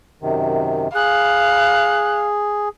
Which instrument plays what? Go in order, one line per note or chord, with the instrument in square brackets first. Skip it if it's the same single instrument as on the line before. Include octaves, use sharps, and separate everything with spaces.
[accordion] F#2 C3 D#3
[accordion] G#4 [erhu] F5 [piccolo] F#6